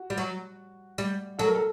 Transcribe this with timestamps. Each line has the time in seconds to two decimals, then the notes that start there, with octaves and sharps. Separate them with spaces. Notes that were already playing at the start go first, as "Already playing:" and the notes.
Already playing: F#4
0.10 G3
0.18 F#3
0.98 G3
1.39 F#3 A4
1.47 A#4
1.55 A4